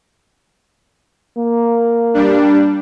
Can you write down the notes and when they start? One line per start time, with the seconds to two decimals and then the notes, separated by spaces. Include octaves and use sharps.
1.37 A#3
2.14 G3 D4